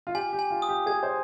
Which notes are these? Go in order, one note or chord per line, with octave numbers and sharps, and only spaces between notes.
F4
G4 G#5
G4
G#5
F4
D#6
G4
G#4 G#6
C5